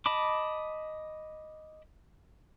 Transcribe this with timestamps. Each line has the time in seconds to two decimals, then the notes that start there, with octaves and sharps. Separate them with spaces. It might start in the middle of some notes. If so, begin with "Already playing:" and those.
0.06 D#5 A5 B5 D6